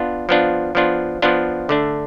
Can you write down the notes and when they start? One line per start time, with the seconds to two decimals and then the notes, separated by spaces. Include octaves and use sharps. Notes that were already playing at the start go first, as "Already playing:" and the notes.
Already playing: B3 D4 F4
0.29 F3 B3 D4 F4
0.75 F3 B3 D4 F4
1.22 F3 B3 D4 F4
1.69 D3 A3 D4